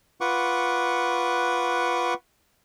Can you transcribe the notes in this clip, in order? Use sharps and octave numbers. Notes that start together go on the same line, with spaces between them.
F4 B4 F#5 C#6 D6